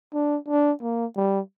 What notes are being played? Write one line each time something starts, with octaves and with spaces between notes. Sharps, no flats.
D4
D4
A#3
G3